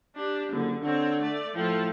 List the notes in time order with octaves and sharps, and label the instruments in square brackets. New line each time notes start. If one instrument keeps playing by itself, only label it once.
[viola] D4 G4
[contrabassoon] F#1 [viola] D3
[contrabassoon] D3 [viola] C4 C#5
[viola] A3 D5
[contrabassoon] A2 [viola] F3 A4